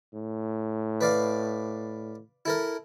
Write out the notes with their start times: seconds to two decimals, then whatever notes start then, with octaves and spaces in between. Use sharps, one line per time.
0.14 A2
1.01 B4 D5 F5
2.45 E4 A4 A#4